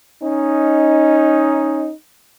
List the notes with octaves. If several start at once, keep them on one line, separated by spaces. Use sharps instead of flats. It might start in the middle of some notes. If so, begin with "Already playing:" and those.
C#4 D#4